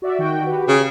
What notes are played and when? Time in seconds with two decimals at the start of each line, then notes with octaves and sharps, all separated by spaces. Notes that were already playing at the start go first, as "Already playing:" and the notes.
0.02 F#4 D5 E5
0.19 D#3 F#4 G5
0.46 F#4 G4 B4
0.68 C#3